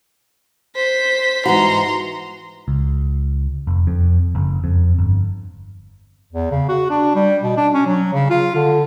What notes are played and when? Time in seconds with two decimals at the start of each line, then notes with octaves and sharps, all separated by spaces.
0.75 C5 B6
1.45 G#2 E3 F#4 A#5 C6
2.68 C#2
3.67 F1
3.87 F2
4.35 F#1
4.64 F2
4.99 G1
6.32 E2
6.51 C#3
6.69 F#4
6.90 D4
7.15 G3
7.42 B2
7.57 D4
7.74 C#4
7.86 F#3
8.13 C#3
8.30 F4
8.55 D3